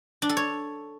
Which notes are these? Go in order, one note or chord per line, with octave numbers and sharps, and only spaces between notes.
D4
A4
C#5